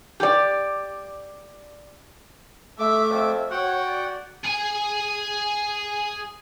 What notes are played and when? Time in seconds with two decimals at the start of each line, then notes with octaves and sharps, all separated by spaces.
0.20 G4 D5
2.79 A3 E5 D6
3.10 F2 E5
3.51 F#4 C#5 F#5 G5
3.88 D5
4.45 G#4 G#5